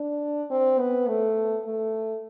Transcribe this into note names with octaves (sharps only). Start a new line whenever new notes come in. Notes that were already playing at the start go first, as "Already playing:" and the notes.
Already playing: D4
C4
B3
A3
A3